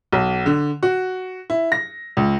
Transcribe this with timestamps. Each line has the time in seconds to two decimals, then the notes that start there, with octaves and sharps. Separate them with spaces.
0.12 B1
0.46 D3
0.83 F#4
1.50 E4
1.72 A#6
2.17 C#2